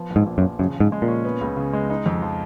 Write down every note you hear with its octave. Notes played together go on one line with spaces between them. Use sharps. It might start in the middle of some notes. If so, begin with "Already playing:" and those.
Already playing: F3 B3
A#1
G#2
A#2
F#2
F3
F#2 C#3
G#2 C#3
G#3
A#2
C#4
B3
C#2
C#3
G#3
D#4
F2
F3